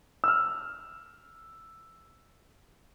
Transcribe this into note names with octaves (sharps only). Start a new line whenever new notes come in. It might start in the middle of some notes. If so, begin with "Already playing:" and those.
E6 F6